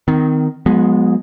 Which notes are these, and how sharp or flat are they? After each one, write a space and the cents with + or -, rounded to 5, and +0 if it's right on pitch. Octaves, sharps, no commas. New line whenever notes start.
D#3 +0 C4 -40
F3 +45 G#3 +0 B3 -5